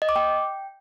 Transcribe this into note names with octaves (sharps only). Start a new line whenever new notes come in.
D#5
D6
G5